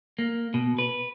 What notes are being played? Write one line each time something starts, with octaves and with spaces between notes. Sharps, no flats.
A#3
B2
B4